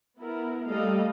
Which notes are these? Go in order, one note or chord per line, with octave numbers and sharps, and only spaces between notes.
B3 E4 A#4
G3 A3 A#3 A4 D#5 F5